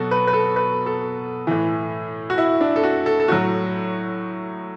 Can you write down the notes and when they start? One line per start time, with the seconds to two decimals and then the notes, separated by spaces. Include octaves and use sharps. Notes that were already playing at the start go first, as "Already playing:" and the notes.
Already playing: B2 F#3 F#4 A4
0.11 B4
0.27 B4
0.33 A4
0.56 B4
0.86 A4
1.47 A2 E3
2.30 F#4
2.38 E4
2.61 D4
2.76 A4
2.83 F#4
3.06 A4
3.20 A4
3.28 A2 F#3 F#4